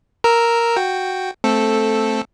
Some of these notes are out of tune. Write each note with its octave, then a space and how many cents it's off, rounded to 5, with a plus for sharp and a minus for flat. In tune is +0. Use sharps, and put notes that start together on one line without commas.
A#4 +0 A#5 +0 E6 +0
F#4 +0 G5 +0
A3 +0 C4 +5 A4 -5